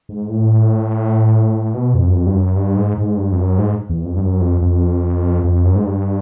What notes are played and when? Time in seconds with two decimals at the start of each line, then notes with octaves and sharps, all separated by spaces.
0.09 G#2
0.29 A2
1.74 B2
1.95 F2
2.07 F#2
2.15 F2
2.26 G2
2.35 F#2
2.56 G2
2.77 G#2
2.98 G#2
3.17 G2
3.32 F2
3.38 F#2
3.59 G#2
3.89 E2
4.05 F2
4.16 G2
4.21 F#2
4.41 F2
4.61 F2
5.44 F2
5.65 F#2
5.76 G#2
5.85 G2